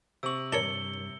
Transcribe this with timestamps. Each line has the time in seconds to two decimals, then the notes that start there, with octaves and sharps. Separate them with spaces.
0.23 C3 C#6 E6 F#7
0.53 G2 D4 A#4 C#5 C#7 G7